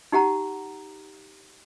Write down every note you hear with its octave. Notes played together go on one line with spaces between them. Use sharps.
D#4 G4 F#5 A#5